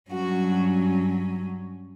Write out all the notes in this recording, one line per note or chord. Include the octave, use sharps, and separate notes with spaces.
G2 F#3 C#4 F#4